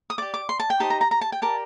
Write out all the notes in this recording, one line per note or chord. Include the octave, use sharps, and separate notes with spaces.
D#6
G4 D5 D6
D6
C6
A5
G5
D#4 G4 C5 D#5 A5
A#5
A#5
A#5
A5
G5
G4 A#4 D5 A5